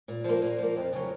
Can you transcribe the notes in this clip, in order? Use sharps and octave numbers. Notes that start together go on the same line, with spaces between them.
A#2
F3 A#3
A#2
F3 A#3
F2
C#3 F#3